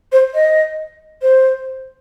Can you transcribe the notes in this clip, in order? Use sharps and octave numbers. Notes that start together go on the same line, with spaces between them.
C5
D#5
C5